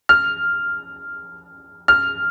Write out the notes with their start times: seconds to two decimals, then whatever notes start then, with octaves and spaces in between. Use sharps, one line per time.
0.09 F6
1.88 F6